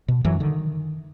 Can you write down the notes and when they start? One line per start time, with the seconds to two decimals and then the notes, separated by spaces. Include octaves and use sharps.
0.08 B2
0.25 F#2 E3 F#3
0.40 D3 D#3